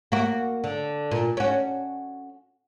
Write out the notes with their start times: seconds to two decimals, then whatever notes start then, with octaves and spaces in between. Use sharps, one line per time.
0.12 A#3 F#4
0.64 D3
1.11 A#2
1.37 C#4 F#4